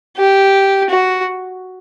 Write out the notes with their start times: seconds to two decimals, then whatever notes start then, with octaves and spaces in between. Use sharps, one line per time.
0.17 G4
0.90 F#4